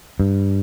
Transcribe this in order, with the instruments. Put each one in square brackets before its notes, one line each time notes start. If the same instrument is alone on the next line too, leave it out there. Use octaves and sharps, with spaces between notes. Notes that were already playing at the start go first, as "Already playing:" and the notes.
[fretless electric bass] G2